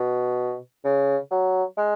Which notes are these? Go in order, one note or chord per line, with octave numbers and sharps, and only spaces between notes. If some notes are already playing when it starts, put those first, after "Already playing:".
Already playing: B2
C#3
F#3
G#3